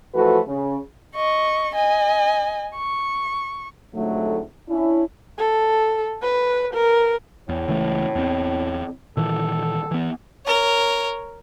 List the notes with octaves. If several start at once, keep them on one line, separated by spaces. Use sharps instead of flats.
E3 F3 A3 F#4 A4 B4
C#3
D#5 C#6
D#5 G#5
C#6
F2 G#2 D3 F#3 A3
C#4 D4 E4
A4
B4
A#4
E2 A2
C#2 E3 A3
E2 C4
A#2 D#3 E3 A4
E3 B3
A#4 C#5